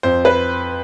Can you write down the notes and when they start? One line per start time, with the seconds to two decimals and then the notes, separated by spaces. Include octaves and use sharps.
0.03 F2 C5
0.25 B4